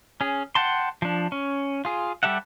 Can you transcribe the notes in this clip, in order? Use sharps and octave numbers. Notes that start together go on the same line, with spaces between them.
C#4 G#4
F#5 G5 A5 C6
F3 D4
C#4
F4 G#4
G3 G4 A4 E5 F#5